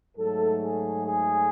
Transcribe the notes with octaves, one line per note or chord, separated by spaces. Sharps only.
G#2 F#3 A3 A4
G#4
G#4